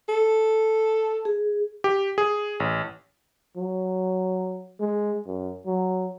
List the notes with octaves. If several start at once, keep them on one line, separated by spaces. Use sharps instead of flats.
A4
G#4
G4
G#4
A1
F#3
G#3
F#2
F#3